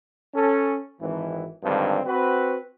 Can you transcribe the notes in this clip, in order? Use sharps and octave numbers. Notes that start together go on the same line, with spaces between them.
C#4 A4
G#1 E3
G2 D3 D#3 F3 G#3 C4
C4 F#4 B4